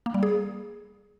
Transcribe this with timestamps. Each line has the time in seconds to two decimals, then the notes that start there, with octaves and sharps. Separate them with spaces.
0.06 A#3
0.14 G3
0.23 G#4